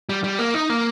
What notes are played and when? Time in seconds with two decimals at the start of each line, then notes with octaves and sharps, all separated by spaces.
0.09 G3
0.24 G3
0.39 A#3
0.54 D#4
0.70 A#3